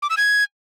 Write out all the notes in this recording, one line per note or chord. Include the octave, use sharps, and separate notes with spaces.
D6
E6
G#6